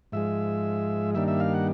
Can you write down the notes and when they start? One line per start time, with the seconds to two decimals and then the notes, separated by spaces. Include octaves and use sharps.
0.12 G#2 F3 G#3 E5
1.15 G2 D#3 G3 A#3 D4 E5
1.28 E5
1.40 F5
1.54 F#5